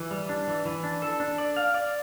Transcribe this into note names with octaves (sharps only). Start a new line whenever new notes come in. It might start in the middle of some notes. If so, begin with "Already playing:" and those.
Already playing: E3
G3
D4
E3
E3
D4
A4
D4
D5
F5
D5